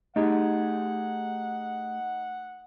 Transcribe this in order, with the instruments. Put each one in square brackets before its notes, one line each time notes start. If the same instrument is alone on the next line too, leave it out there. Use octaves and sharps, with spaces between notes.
[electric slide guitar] A3 G4 G#4 [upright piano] D#4 [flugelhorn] F#5